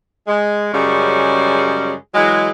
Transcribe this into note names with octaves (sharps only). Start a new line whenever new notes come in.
G#3
F#2 C#3 G3 G#3 C#4
E3 F#3 G#3